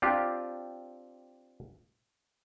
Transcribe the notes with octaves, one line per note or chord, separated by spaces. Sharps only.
C4 D4 F4 G4